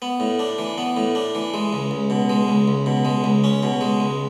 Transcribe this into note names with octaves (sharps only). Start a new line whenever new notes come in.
B3
A2
D4
E3
B3
A2
D4
E3
G#3
C#2
C#2
B2
G#3
C#2
C#2
B2
G#3
C#2
C#4
B2
G#3
C#2